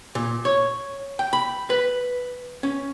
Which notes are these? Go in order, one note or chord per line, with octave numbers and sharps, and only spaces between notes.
A#2
C#5
G5
B5
B4
C#4